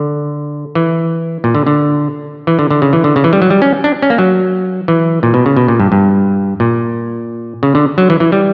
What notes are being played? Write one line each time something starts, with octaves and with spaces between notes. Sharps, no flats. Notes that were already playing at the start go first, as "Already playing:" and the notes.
Already playing: D3
E3
A#2
D3
D3
E3
D3
D3
C#3
E3
D3
C#3
E3
G3
F#3
G3
C#4
D4
C#4
A#3
F#3
E3
A#2
B2
C#3
B2
A#2
G2
G2
A#2
C#3
D3
F#3
E3
E3
G3